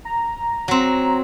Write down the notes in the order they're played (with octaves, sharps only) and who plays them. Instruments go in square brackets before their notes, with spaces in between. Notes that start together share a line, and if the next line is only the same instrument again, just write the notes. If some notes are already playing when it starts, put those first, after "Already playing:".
[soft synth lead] A#5
[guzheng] F#3 C4